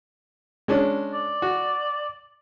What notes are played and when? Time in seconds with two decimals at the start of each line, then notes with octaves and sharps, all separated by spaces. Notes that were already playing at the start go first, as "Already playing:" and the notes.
0.68 G#3 C#4 D4
1.14 D5
1.42 F#4